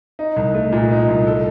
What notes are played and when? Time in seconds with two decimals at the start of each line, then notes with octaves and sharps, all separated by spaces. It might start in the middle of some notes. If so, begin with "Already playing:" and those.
0.19 D#4
0.36 C2
0.54 A3
0.72 A#2
0.91 D#4
1.09 C2
1.27 A4